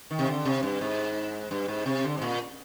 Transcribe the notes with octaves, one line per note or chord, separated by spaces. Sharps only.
D#3
C3
D3
C3
G2
G#2
G2
G#2
C3
D3
G#2
A#2